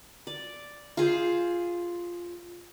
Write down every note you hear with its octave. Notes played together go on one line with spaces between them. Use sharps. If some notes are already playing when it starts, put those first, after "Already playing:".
D5
F4 G#4 C5